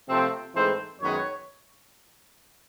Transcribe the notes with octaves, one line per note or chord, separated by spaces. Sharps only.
C3 F3 A3 C4
G#2 E3 A3 C4 C5
F#2 D#3 G#3 B3 C#5